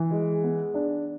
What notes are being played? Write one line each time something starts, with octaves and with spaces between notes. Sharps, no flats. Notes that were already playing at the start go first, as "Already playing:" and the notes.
Already playing: E3
G#3
B3
D4